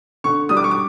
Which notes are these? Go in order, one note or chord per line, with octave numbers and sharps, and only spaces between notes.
D3 C#6
G3 D#6
D6
C#6
D6